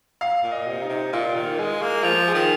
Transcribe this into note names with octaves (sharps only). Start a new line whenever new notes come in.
F5
A#2
D#5
C3
D#4
C3
A#2 F4
D#3
G#3 G#4
A#3
F3 F4
G#4
D#3